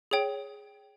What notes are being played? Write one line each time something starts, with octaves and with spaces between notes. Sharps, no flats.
G#4 C#5 G5